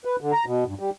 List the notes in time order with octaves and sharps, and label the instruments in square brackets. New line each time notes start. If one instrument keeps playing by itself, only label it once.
[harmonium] B4
D3
A#5
B2
G2
G3